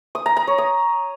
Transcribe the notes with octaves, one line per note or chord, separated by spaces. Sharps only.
D#6
A#5
A#5
C#5
D#6